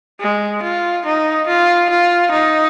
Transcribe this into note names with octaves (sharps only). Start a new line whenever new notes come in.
G#3
F4
D#4
F4
F4
D#4